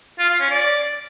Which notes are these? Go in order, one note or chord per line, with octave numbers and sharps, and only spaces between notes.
F4
F4
C#4
D5